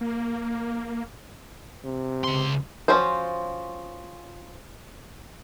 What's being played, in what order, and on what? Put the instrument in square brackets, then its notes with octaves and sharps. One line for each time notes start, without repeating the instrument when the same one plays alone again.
[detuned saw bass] A#3
[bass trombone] C3
[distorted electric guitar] C#2 C6
[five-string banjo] F3 C#4 F#4 C5